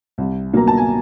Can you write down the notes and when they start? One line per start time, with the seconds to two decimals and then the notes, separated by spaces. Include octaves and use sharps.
0.18 C2
0.53 B2 F#3 A#3 A#5
0.68 A5
0.77 G#5